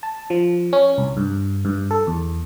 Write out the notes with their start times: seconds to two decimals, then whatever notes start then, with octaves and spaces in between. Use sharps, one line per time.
0.03 A5
0.30 F3
0.73 C#4
0.98 C2
1.17 G2
1.65 G2
1.91 A4
2.07 E2